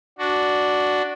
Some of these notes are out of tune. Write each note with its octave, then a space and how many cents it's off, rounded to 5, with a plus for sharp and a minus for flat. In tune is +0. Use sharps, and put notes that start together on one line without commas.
D4 -5 F#4 +0